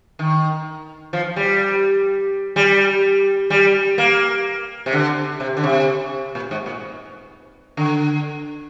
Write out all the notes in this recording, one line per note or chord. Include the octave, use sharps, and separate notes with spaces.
D#3
F3
G3
G3
G3
A#3
C3
D3
C3
D3
C3
A#2
G#2
A#2
D3